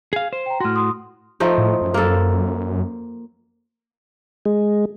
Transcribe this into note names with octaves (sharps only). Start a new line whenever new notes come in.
G#4 F5
C5
G5 A#5
A2 F#4 C6 F6
C6 D#6
F3 A3 D#4
A2
F#2
A#3 A4
G#3